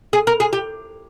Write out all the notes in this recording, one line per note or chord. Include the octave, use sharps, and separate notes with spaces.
G#4
A#4
G#4
G4